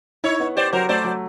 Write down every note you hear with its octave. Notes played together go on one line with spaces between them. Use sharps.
D#4 E4 C#5
B3
G4 C5 D5
F#3 A#4 C5
A3 C5 D5
F#3